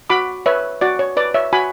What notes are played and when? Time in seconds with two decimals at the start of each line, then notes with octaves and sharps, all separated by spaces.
0.10 F#4 B5 D6
0.46 B4 C#5 E5
0.81 F#4 D5
0.99 C#5
1.17 B4 D5
1.34 C#5 E5
1.53 F#4 G#5 B5